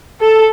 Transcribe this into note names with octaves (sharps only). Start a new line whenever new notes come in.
A4